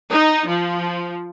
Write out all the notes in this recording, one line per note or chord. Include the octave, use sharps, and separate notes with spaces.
D#4
F3